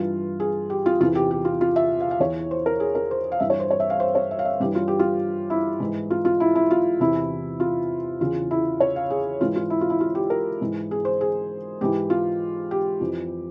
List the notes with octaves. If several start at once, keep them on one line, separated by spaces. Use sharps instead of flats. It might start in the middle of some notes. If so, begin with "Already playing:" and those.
Already playing: G2 E3 F4
G#4
G4
F4
E2 C3 E3 F4
G4
G4
F4
F4
E5
F5
F5
E2 E3 C#5
C5
A#4
G#4
A#4
C5
F5
G2 E3 E5
C#5
C5
C#5
E5
F5
C5
C#5
E5
F5
E5
G2 E3 G4
F4
G4
F4
E4
G#2 E3
F4
F4
E4
E4
F4
E2 C3 E3 E4
F4
E2 C#3 E3 F4
E4
C#5
F5
G#4
G#2 E3 F4
F4
E4
F4
E4
F4
G4
A#4
G#2 E3
G#4
C5
G#4
G#2 E3 G4
F4
G4
F2 E3